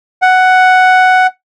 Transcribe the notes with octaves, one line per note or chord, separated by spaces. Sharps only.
F#5